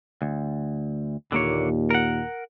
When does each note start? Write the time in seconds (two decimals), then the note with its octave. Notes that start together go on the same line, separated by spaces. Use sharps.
0.22 D2
1.32 D#2 A#2 D3 A#3 C#5
1.90 A#4 F#5